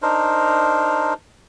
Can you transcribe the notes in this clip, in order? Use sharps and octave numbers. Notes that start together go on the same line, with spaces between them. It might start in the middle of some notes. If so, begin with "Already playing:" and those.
D4 D#4 A#4 C5